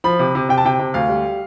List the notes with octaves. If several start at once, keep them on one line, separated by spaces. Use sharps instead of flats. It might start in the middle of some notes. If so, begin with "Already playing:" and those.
F3 B5
C3
C3
C3 G5
A5
C3 G5
C3
D2 F5
G3